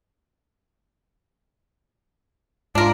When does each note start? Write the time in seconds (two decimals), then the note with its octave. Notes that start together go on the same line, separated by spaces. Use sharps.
2.75 G#2 D4 F4 A#4